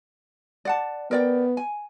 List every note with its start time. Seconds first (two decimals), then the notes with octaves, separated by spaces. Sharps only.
0.65 D5 F#5 A5
1.11 B3 A#4 D5 G5
1.57 G#5